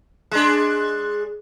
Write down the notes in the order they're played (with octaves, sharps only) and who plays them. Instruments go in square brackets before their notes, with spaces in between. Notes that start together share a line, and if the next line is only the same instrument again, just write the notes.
[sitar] G#3 D4